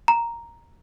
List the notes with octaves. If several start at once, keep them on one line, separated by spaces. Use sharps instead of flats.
A#5